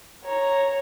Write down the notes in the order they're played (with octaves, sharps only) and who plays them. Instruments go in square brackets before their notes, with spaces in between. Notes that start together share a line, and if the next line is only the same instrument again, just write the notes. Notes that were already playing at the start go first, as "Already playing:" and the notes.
[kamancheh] C#5 A#5